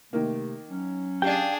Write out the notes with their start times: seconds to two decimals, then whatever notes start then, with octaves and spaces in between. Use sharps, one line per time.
0.13 C3 D#3 A3 A#3
0.70 F#3 C#4
1.22 D4 G4 G#4 D5 F5 G5